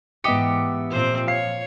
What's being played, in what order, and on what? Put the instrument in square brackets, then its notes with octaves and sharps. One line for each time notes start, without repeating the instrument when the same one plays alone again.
[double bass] G#2 E3 [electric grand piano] B3 C#7 [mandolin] G4 D#5 E5
[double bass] A#2 F3 [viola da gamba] C4 C5
[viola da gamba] C#5 [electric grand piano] F5 C7